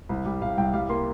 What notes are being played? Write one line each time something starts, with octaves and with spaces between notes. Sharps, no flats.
C2
G3
C2 F5
C2 G5
G3 F5
A#3 C6